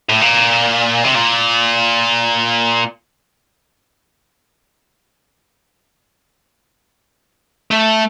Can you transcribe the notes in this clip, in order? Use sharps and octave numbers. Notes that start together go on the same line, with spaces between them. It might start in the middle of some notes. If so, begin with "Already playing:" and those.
A2
A#2
C3
A#2
A3